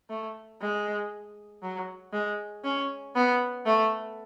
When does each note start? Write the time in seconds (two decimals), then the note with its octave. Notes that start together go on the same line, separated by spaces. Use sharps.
0.09 A3
0.61 G#3
1.63 F#3
2.13 G#3
2.64 C#4
3.16 B3
3.66 A3